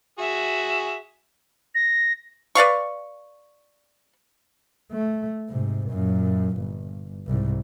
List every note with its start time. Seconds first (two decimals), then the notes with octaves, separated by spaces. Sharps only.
0.19 F#4 G#4 E5
1.75 A#6
2.55 B4 D5 F5 C#6
4.92 A3
5.49 G#2 C3
5.90 F#2 A#2
6.57 G1
7.27 C2 G#2